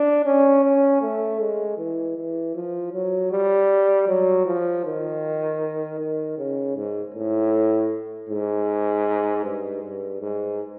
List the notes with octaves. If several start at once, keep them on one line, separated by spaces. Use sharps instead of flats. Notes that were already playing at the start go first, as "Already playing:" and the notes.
Already playing: D4
C#4
C#4
A3
G#3
E3
E3
F3
F#3
G3
F#3
F3
D#3
D#3
C#3
G#2
A2
G#2
G2
G2
G#2